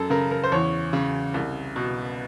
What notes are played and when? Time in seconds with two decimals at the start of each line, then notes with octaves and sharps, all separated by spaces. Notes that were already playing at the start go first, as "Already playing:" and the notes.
Already playing: F#2 A4
0.10 C#3 A#4
0.31 A#4
0.44 C5
0.52 E2 C#5
0.93 C#3
1.34 C2
1.76 B2